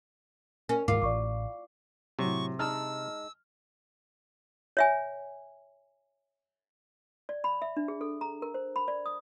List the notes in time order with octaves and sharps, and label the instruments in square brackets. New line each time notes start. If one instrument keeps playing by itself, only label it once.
[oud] C#4 [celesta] A#4
[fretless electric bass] D#1 G#2 [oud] F4 [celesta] A#4 D6
[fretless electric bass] A1 [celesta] D5 C#6 D6
[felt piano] A2 F#3 [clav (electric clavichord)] C3 [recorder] C#6
[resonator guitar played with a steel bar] G#3 D#4 A5 [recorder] E6 [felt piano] F6
[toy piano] C#5 E5 G#5
D5
B5
E5
D4
G#4
A4
A#5
A#4
C5
B5
D5
D#6